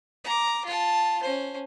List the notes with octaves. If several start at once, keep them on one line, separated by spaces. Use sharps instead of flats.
A#5 D6
F4 A5
C#4 C5